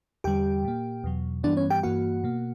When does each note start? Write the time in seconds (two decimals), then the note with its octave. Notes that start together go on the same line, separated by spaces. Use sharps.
0.24 E2 D3 G3 G4 G5
0.65 A#2 A#3
1.04 E2 B2 F#3
1.44 G2 E3 G3 B3 D4 D5
1.57 C#4 C#5
1.70 G4 G5
1.83 G2 E3 A#3 F#4 F#5
2.24 B2 A#3